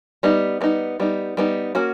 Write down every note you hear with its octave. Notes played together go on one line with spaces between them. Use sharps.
G3 B3 D#4
G3 B3 D#4
G3 B3 D#4
G3 B3 D#4
A#3 C#4 F#4